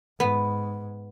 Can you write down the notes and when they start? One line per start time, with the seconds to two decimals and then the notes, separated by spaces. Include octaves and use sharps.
0.20 G#2 B3